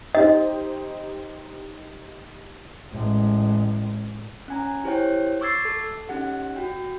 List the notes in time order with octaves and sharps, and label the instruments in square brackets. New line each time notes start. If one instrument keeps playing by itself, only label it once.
[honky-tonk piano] D#4 G4 C5 [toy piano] D#5
[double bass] A1 G#3
[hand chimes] C#4 G#5 A#5
E4 G4 C5 C#5 G5
C#6 D6 E6 G#6 A6 C7
A4
C#4 D#4 G4 F#5
F#4 G5